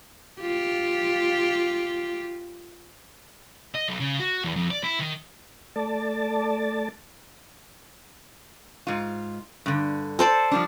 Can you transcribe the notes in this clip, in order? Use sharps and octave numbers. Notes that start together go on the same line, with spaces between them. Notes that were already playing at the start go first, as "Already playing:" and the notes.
F4 G4
D#5
B1
C#3
F#4
E2
F2
D5
E4
D#3
A3 D5 A5
G#2 F4
G2 D3
A4 C5 D5
F3 G3 D4